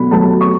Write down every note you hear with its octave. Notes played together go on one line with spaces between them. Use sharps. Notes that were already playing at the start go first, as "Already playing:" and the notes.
Already playing: B2 F#3 A3 B5
F#3 A3 A5
C#6